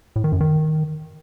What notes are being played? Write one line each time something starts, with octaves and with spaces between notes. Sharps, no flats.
A2
D#3
F#2
D#3